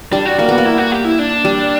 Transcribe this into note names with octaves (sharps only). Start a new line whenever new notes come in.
G3 D4
F#4
A#3 F#4
B3 F#4
A#3
E4
F#4
G4
E4
D4
G3